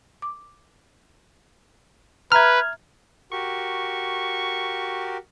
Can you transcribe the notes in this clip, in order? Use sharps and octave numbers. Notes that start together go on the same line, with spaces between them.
D6
B4 E5 A#5 F6 G#6
F#4 G4 A#4 C#6